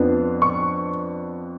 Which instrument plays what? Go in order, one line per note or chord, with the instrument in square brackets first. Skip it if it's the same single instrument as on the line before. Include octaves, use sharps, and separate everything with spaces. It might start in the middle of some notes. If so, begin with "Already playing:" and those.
Already playing: [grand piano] F2 F3 B3 D4
C#6